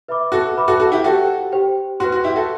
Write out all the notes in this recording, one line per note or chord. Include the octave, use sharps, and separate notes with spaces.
B4 E5 B5 D6
F#4 A4
B4 E5 B5 D6
F#4 A4
F#4 A4
E4 G4
F#4 G4 A4 C5 G5
G4 C5 G5
F#4 B4 F#5 C6
F#4
E4 G4
F#4 A4